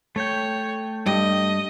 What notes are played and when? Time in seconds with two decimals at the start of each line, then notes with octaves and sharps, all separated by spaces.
0.16 A3 C#5 G5
1.06 G2 D#5